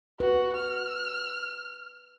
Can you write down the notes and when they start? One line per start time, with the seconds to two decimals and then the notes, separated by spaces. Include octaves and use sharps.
0.20 F#4 B4
0.56 F6